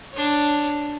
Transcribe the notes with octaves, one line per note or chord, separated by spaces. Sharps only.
D4 C#5